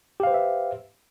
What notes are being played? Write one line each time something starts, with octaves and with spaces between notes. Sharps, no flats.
G4 B4 C5 E5 F5